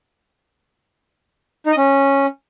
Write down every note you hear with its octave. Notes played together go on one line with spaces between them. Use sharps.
D#4
D#5
C#4